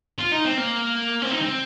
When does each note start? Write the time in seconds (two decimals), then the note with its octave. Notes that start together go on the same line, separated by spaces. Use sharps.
0.19 F4
0.32 D#4
0.45 C4
0.58 A#3
1.22 C4
1.32 D#4
1.42 C4